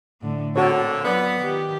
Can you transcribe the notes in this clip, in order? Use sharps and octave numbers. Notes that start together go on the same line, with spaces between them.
A2 D3
A#2 D3 C4 F#4 A4 C#5
F#3 B3 F4 D5
D#3 G4